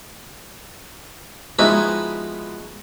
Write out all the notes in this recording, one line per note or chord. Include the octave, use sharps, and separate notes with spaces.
F3 G#3 B3 D#4 E4 F#4